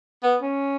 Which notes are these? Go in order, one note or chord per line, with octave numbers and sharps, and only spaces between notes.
B3
C#4